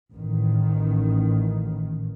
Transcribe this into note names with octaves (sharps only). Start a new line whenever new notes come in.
A1 D#3